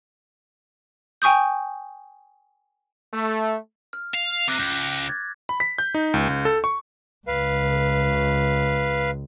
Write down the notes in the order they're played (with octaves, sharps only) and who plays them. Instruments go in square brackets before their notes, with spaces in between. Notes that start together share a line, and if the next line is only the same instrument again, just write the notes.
[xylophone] G5 G#5 C#6 D#6 G6
[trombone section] A3
[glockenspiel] F6
[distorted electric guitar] F5
[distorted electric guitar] C3 [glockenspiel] D6 F#6 A#6
[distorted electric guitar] C#2 [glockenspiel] G6
[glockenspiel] G#6 A6
[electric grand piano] B5
B6
G6
D#4
C#2
C#2
A4
C#6
[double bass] C#2 [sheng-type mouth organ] B4 F5